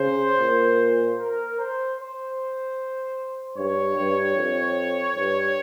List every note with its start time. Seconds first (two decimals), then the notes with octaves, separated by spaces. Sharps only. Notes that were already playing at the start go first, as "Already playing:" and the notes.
Already playing: C#3 C5
0.40 A#2
1.19 A#4
1.59 C5
1.99 C5
3.57 G2 C#5
3.97 G2
4.36 F2
5.16 G2